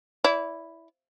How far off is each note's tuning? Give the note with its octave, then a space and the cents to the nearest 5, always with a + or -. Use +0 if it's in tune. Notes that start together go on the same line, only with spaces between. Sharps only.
E4 +0 D5 -35